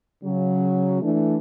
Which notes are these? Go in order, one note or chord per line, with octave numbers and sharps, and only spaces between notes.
C#3 F#3
E3 A3 D4